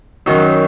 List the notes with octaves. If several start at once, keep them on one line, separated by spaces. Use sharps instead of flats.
F#2 D#3 F#3 D#4